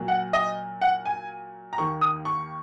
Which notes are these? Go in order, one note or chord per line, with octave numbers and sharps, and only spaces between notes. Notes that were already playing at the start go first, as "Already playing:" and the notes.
Already playing: A#2 F#3 A#3
F#5
D#5
F#5
G#5
A#5
D#2 D#3 A#3 C#6
D#6
C#6